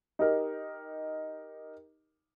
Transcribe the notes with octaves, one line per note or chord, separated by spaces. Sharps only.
D#4 G4 A#4